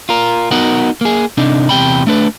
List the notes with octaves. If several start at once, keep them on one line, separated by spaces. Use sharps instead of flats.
F4 A#4
B3 D#4 F#4 A#4 F#5
A#3 G#4
C3 D4 D#4
E2 C3 G5 B5
A3 D4 B4